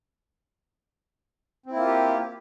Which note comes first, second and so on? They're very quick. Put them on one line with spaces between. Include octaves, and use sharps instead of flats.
C4 E4 A#3 F4 G4